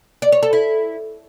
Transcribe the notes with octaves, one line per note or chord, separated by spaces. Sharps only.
D5
C#5
A4
E4